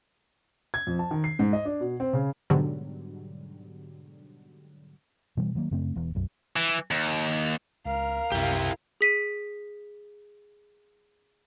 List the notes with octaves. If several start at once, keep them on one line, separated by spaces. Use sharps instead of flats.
G#6
F2
A5
D#3
C7
G#2
D#5
D4
B2
C4
C#3
G#2 B2 D3 F#3 G3
B2 E3 G3
D#3 F#3 G3 A#3
F#2 C#3 A3 C4
E1 E2
B1 F#2
E3
D#2
C#2 A#4 F5
C2 F#2 C3 E4 G4
G#4 B6 D#7